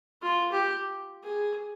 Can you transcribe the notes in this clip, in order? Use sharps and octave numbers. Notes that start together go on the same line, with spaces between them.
F4
G4
G#4